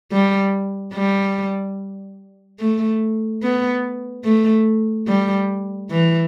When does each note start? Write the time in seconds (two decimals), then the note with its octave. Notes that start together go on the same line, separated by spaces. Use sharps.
0.12 G3
0.94 G3
2.60 A3
3.42 B3
4.25 A3
5.08 G3
5.91 E3